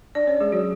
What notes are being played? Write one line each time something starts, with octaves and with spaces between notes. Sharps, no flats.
D4 D5
C#4 C#5
G#3 G#4
F#3 F#4